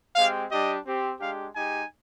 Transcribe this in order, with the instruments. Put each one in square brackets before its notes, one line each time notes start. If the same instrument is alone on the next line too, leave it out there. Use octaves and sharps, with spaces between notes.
[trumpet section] G#3 C4 G4 F5
G3 D4 G4 D#5
C4 G4
G#3 D4 G4 F5
G#3 D#4 G4 G#5